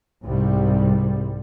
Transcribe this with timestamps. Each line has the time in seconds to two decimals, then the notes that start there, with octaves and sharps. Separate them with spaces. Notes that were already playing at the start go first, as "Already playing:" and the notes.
0.24 C2 G#2 C3 G3